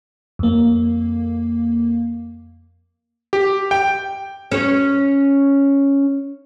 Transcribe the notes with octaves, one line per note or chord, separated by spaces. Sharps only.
F2 A#3
G4
G5
C#4 C#5